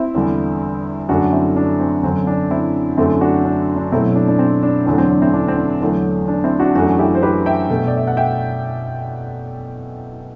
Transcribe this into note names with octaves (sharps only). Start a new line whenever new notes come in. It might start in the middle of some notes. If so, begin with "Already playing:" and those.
Already playing: C4 E4
E2 D3 G3
F#2 D3 A3 D4 F#4
C4 E4
D4
C4
F#2 D3 F#3 C4
D4
C4 E4
F#2 D3 A3 C4 E4
D4 F#4
D4
D4
B2 F#3 A3 C4 E4
D4
D4
C4
D4
E2 D3 F#3 A3 D4
C4
D4
C4 E4
D4
C4
D4
E2 D3 F#3 A3
D4
C4 E4
D4 F#4
F#2 E3 A3 D4 F#4
E4 G4
C5
G4 B4
E5 G5
B2 A3
D5
E5
F#5
E5 G5